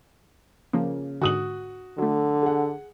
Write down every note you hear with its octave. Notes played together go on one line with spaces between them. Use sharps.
C#3 F3 A#3
G#2 D3 F#4 D#6 F#7
D3 F#3 A3
G#4 F#5